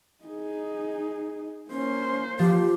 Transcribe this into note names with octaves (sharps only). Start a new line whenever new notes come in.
D#4 G#4
A#3 C#4 C5
F3 G4